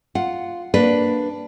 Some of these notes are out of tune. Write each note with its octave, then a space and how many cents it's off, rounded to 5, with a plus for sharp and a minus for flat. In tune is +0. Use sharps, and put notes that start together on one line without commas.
F4 +0 F#5 +0
A#3 +5 D4 +0 B4 +0